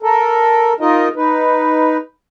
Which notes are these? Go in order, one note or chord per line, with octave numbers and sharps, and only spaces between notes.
A4 A#4
D#4 F4 A#4 D#5
D#4 B4